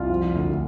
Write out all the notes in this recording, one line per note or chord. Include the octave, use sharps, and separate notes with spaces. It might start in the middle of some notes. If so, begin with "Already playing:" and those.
Already playing: C2 F4
F3
D2